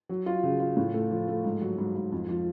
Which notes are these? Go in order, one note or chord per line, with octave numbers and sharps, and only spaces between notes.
F#3
F4
C#3
F4
A2
A3
F3
A3
G#2
F#3
G#2
G#2
F2
F3